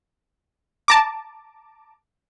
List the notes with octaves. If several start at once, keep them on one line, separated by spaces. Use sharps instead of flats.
A5 A#5 D6